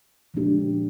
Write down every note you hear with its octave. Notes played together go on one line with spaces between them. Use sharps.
A#2 F3 G#3 D4 G4